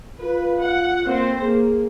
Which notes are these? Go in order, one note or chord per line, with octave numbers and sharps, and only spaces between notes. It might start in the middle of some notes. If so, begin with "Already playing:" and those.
F4 B4
F#5
A#3 C4 C5
A#3 G#4